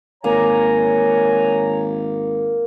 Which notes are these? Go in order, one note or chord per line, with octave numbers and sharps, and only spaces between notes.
G#1 A#3 C#5 G#5 A#5